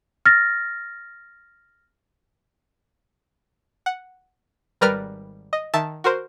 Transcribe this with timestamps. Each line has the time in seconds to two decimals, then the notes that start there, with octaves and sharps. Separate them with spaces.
0.26 F6 A6 A#6
3.86 F#5
4.81 G#1 G3 A#4 B4 D5 F6
5.53 D#5
5.74 D#3 E5 A5
6.04 F#4 A#4 C5